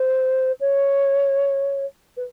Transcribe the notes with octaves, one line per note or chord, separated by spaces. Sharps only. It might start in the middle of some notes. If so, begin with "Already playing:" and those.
Already playing: C5
C#5
B4